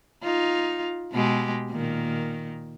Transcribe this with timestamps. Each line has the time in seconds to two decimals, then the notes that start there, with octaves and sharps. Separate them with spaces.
0.23 D#4 F4
1.12 B2 G#3 G4
1.70 A#2 D#3